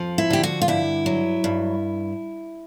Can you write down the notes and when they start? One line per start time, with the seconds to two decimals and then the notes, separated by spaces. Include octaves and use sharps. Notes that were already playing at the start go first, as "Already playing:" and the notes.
Already playing: F2 F3
0.18 E4
0.30 D3 G4
0.43 F#4
0.62 F4
0.68 G2 E4
1.06 F#3
1.44 G2